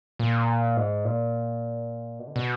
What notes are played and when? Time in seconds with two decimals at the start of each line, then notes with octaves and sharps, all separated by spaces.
0.19 A#2
0.77 G#2
1.05 A#2
2.19 B2
2.27 D3
2.36 B2